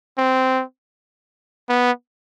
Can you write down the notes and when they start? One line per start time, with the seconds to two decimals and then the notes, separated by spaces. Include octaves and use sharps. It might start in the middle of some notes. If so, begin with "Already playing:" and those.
0.18 C4
1.69 B3